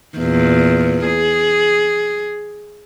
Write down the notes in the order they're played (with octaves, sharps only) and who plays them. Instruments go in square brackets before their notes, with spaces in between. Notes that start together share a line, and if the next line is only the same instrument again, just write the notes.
[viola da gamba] E2 A#2
G#4